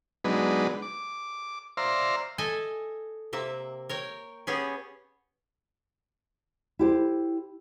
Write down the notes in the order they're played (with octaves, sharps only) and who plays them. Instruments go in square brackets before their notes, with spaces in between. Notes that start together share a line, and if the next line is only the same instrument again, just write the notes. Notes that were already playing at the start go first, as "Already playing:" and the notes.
[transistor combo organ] F#3 G#3 B3 D4 D#4 B4
D6
C5 D5 E5 F5 A#5 C6
[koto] A4 D#5 E5 G#5
C3 A#3 E5
A#4 C#5 G5
B3 C#4 G4 G#4
[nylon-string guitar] E4 G4 C5